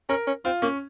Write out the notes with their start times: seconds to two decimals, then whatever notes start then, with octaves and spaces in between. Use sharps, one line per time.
0.09 C#4 A#4
0.27 C#4
0.45 C4 F4
0.62 A#3 C#4